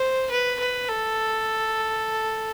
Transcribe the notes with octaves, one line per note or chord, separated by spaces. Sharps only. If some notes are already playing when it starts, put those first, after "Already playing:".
Already playing: C5
B4
B4
A4